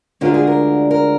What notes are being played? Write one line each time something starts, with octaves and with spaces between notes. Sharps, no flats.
D2 D3 G#3 D4 F4 A#4
G#4
A#4
A#4